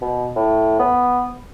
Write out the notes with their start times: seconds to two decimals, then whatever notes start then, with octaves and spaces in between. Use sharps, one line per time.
0.02 B2
0.36 A2
0.79 B3